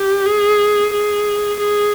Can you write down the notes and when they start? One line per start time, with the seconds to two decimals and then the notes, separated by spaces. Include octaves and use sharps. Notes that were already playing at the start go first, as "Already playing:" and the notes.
Already playing: G4
0.26 G#4
0.93 G#4
1.60 G#4